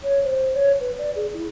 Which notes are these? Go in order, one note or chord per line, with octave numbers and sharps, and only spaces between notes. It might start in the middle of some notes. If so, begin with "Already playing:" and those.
C#5
C5
C#5
B4
D5
G#4
E4